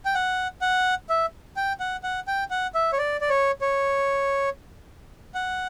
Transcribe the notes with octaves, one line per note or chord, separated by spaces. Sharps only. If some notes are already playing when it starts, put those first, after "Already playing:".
G5
F#5
F#5
E5
G5
F#5
F#5
G5
F#5
E5
C#5
D5
D5
C#5
C#5
F#5